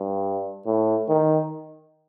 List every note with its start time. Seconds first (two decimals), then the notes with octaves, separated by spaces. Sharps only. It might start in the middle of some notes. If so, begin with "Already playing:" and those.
Already playing: G2
0.66 A2
1.09 D#3